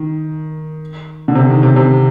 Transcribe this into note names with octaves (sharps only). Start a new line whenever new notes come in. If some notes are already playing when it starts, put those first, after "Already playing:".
Already playing: D#3
D3
C3
D#3
C3
C3